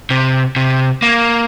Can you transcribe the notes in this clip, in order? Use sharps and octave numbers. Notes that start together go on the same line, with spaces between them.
C3
C3
A#3